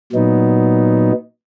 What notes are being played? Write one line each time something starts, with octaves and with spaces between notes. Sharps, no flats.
A#2 F#3 B3 D#4